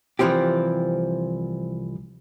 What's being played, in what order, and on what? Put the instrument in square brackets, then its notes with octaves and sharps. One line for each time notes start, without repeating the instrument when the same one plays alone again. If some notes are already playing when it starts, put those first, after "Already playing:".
[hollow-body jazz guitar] C2 E3 F3 C4 G4